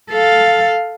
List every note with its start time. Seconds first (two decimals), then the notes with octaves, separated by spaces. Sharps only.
0.11 A4 F5